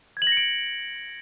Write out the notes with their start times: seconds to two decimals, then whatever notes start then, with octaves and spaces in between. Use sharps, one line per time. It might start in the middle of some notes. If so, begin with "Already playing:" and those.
0.17 G#6
0.22 F#7
0.27 A#6
0.32 C#7
0.37 D7